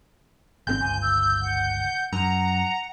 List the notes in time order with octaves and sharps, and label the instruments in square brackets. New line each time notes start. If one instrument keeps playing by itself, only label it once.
[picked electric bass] G#1 B2 C4 [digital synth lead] G6
[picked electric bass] G1 C#2 [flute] G#5
[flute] E6
F#5
[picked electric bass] F#2 [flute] F#5 [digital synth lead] A#5